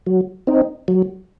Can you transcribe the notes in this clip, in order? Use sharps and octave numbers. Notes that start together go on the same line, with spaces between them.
F#3
C4 D#4
F#3